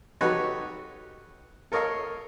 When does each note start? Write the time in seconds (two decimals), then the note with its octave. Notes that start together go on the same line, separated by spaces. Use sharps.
0.21 D#4 F#4 G4 A4 B4 C#5
1.72 A4 A#4 C#5 D#5 F5